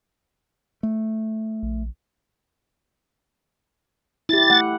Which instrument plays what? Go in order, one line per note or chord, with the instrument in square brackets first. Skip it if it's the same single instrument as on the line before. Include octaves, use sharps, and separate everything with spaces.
[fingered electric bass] A3
[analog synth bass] A#1
[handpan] E4 G4 [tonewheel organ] A6
[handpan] A3 F#5